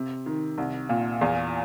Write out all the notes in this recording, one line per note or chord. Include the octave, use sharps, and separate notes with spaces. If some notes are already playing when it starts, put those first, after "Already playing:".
Already playing: C3
D#3
C2
A#2
E2